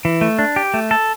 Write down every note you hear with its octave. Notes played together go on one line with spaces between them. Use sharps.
E3
A3
D4
G4
A3
A4